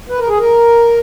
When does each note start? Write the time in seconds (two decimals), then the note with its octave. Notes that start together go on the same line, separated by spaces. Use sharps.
0.09 B4
0.19 A#4
0.28 G#4
0.38 A#4